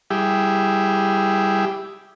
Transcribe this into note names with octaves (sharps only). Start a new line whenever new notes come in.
G3 E4 G4 G#4